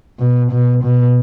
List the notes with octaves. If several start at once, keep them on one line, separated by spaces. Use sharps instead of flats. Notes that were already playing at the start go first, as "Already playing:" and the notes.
B2
B2
B2